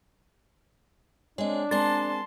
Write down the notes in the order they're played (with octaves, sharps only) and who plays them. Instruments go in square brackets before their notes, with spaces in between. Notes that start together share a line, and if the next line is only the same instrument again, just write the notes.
[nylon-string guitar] G#3 C4 [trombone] D4 [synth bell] C#5 D#5
[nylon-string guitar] G#3 C4 A#4 [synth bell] D5 A6 [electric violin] A5 C6